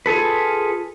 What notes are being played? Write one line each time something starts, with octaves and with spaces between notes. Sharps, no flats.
F4 G#4 A4 B4